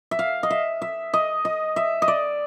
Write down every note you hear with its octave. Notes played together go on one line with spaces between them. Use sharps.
E5
F5
D#5
E5
E5
D#5
D#5
E5
D#5
D5